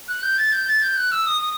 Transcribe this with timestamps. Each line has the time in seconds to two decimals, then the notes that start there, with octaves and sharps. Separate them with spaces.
0.08 F#6
0.23 G6
0.38 A6
0.52 G6
0.67 A6
0.82 G6
0.97 F#6
1.12 E6
1.26 D#6
1.41 D#6